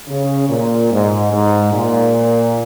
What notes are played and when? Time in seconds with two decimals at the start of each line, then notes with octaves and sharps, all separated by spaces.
0.09 C#3
0.50 A#2
0.91 G#2
1.33 G#2
1.73 A#2